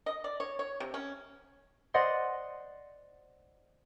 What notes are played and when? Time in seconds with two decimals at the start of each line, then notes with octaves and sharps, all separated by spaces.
0.06 D#5
0.24 D5
0.40 C#5
0.59 C#5
0.80 C3
0.94 C#4
1.94 C5 D5 D#5 F#5 C6